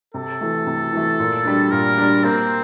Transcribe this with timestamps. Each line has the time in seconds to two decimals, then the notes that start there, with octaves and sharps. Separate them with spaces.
0.14 C3 A4
0.41 E3 A3
0.67 C3
0.93 E3 A3
1.19 A#2
1.45 G3 D4
1.71 A#2 A#4
1.98 G3 D4
2.24 A#3 C4